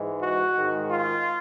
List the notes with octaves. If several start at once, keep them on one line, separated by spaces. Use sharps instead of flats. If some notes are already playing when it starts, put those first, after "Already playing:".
Already playing: G#2 E3 G#3
F#4
G#2 D#3 G#3
F4